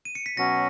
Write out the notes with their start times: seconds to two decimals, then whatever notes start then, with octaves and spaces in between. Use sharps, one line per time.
0.05 D#7
0.15 C#7
0.26 B6
0.37 B2 F#3 C#4 F#4 A#6